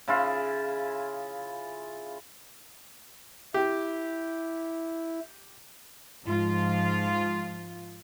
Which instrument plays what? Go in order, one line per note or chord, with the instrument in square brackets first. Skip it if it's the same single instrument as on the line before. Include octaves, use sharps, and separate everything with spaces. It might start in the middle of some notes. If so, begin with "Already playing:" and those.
[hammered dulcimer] C#3 E4 F4
[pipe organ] E4 [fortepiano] G4
[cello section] G#2 F3 F4